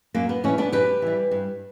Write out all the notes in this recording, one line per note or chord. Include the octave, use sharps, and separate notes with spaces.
F#2 A#3
B3
E3 G3 A#3 C#4
B3 D4
F#2 G4 B4
E3 G3
G2